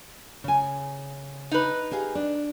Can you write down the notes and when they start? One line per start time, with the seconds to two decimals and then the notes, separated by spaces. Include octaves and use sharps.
0.44 C#3 G#5
1.51 D#4 B4
1.91 G4 G#4 F5
2.15 D4